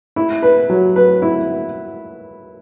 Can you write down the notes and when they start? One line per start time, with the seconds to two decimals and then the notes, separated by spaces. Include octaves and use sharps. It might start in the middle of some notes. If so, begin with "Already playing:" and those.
0.16 E4
0.43 B4
0.69 F#3
0.96 B4
1.22 E4